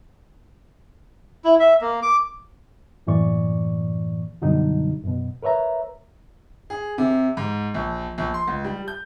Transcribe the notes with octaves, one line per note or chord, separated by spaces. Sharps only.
E4
E5
A#3
D6
F#2 A2 E3 A#3 D5 C#6
F#2 B2 D3 F#3 G3 D#4
F#2 B2
A#4 B4 C#5 E5 A#5
G#4
C3
G#2
A#1
A#1
C6
C#2
G3
G6